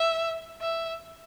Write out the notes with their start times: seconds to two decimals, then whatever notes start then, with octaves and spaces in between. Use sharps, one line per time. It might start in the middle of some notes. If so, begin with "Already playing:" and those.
Already playing: E5
0.61 E5